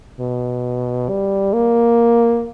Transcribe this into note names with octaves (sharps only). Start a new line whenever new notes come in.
B2
G3
A#3